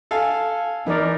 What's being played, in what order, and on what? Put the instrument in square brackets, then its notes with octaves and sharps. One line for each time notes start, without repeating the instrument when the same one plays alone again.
[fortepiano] A4 F5 G#5
[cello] E3 [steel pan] D#4 A#4 D5